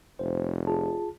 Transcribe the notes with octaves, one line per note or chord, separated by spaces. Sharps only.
F1 C5
F4 G#4 A5